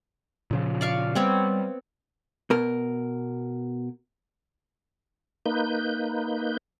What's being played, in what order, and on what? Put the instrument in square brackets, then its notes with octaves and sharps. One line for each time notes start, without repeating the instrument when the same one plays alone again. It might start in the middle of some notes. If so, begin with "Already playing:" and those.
[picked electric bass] A#2 C#3 F3
[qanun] D5 F5 C#6
[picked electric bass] G3 [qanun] B3 C4 C#5
[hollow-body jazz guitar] B2 A#4
[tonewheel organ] A#3 D#4 B4 G6